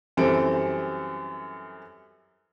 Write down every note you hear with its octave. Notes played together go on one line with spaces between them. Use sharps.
F#2 E3 G3 C4 A4 D7